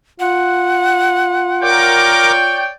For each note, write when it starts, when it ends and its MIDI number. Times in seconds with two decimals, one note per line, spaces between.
0.20 2.63 65
0.20 2.01 78
1.62 2.32 70
1.62 2.70 73
1.62 2.70 74
1.62 2.70 79
1.62 2.32 86